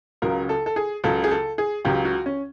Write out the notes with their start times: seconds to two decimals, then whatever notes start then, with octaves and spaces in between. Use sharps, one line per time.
0.22 C#2 C#3 F#3 A#4
0.49 A4
0.66 A4
0.76 G#4
1.04 C#2 C#3 F#3 A4
1.24 G#4
1.31 A4
1.58 G#4
1.85 C#2 C#3 F#3 G4
2.05 F#4
2.26 C#4